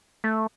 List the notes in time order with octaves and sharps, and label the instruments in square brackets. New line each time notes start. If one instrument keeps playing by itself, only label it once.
[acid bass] A3